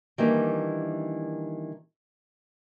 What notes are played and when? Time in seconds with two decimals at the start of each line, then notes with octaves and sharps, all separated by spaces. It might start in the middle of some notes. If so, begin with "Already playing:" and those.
0.18 D#3 E3 G3 A#3 D4 B4